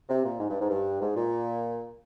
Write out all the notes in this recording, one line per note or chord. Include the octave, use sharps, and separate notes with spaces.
C3
A#2
G#2
G2
G#2
G2
G#2
A#2